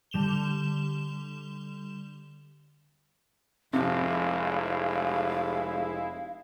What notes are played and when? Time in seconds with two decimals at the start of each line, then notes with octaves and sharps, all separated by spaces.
0.11 D3 G3 E7 F7 G7
3.73 F1 C3 F3 G#3 E4 F5